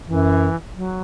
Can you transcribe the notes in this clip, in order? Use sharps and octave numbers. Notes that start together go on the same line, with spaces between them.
F#2 E3
F#3